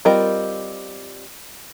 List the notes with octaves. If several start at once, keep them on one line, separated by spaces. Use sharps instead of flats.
G3 C4 F4 A#4 D#5